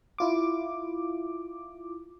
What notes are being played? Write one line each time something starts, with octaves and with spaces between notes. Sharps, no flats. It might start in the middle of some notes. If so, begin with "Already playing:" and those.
E4 F4 D6